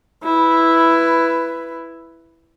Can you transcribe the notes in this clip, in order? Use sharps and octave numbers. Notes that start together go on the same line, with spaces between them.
E4 B4